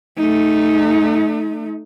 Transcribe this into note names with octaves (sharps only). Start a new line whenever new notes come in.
A3 D#4